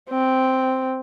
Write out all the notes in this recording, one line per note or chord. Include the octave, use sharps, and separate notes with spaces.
C4